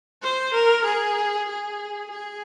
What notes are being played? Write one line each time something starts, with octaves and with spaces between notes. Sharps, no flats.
C5
A#4
G#4
G#4
G#4